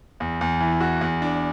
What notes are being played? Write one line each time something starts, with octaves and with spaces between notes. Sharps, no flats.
E2
E2
E3
F#4
E2
D4